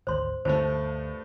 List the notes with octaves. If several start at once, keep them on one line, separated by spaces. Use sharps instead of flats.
G#1 D2 C5 C6
D2 G2 D3 A3 D4 D#4 C5